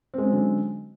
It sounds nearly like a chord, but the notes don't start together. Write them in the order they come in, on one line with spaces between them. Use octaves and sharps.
C4 G#3 C#4 F#3 D3